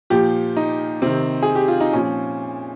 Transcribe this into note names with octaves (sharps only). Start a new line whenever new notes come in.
A#2 F3 G4
D#4
C3 D#3 C4
G#4
G4
F4
D#4
A#2 F3 C#4